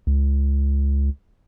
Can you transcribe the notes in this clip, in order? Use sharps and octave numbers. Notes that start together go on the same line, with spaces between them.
C#2